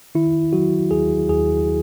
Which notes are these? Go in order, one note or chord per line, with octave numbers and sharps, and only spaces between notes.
D#3 E4
F#3 F#4
D#2 G#4
D#2 G#4